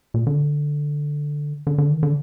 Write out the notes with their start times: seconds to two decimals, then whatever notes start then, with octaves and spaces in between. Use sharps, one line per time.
0.14 A#2
0.27 D3
1.67 D3
1.78 D3
1.91 D#3
2.03 D3